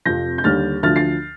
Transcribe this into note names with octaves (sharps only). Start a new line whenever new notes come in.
F2 C3 F3 G6 A#6
G6
D#2 D3 G3 F6 A6
D2 D3 F3 F6 A6
A6 C7